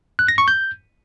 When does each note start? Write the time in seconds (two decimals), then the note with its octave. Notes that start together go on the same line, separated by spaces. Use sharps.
0.19 F#6
0.28 A#6
0.38 C#6
0.48 G6